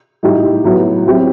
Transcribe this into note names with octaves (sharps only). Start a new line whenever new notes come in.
A2 G3 D#4 G4
A2 F#3 B3 F#4
F#3 C4 E4 G4